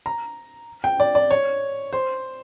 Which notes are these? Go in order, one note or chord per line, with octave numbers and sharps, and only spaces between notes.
A#5
G5
D5
D5
C#5
C5